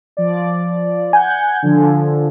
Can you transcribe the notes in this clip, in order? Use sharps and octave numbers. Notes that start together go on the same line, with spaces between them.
F3 D5
F#5 G#5 G6 G#6
D3 F3